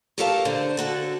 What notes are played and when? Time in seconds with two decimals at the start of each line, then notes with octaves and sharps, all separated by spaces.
0.18 G4 A4 A#4 C#5 F5 A5
0.45 D3 C5
0.77 D3 F#4 A4